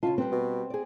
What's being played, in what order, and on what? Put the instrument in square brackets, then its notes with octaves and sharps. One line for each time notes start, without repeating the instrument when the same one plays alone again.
[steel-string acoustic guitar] C#3 C#4 A5 [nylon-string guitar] F4 F5
[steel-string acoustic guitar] G3 B4 C5 [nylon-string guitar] C4
[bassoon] B2
[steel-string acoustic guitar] G#4 D5